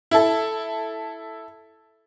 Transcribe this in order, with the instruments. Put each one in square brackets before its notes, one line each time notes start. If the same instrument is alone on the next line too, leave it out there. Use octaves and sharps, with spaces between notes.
[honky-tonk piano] E4 A4